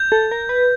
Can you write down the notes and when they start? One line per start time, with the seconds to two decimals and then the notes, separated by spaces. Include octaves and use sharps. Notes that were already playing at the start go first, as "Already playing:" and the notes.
Already playing: G6
0.12 A4
0.31 A#4
0.49 B4